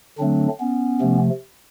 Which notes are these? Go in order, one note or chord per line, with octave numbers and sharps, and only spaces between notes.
D3 F#3 A3 C4 D4
B3 C#4
C3 F3 A3